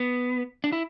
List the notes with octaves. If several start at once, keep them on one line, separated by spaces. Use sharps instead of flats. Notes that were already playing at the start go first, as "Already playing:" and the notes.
Already playing: B3
D4
E4